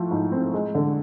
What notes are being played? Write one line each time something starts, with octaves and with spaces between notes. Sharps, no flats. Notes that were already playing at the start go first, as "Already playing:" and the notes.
Already playing: A2 F3 A3
G#2
C4
G#3
D3